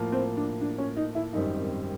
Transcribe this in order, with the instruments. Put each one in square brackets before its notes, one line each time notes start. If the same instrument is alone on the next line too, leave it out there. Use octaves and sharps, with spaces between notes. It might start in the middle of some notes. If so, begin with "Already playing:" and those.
Already playing: [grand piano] A2 F3 A#3
[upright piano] C4
D4
D4
C#4
D#4
E4
[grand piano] G#1 F#2 D#3 G3 C4 [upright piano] D#4